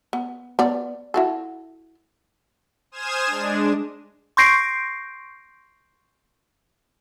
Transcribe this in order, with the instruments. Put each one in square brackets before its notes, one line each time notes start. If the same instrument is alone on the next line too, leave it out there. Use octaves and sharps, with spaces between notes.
[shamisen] B3
B3 D5
E4 F#4 A4
[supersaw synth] C5 G#5 D#6 F6 G#6 E7
G#3 D4
[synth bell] C6 C#6 G6 A#6 C7 D7